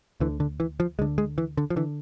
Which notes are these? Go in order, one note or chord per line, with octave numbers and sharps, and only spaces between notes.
D2 D3 E3
D3
E3
F3
D2 D3 G#3
G#3
E3
D3
F3
D3 E3